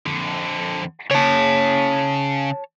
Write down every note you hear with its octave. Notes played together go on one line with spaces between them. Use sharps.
F2 D3
C#3 C#5 A5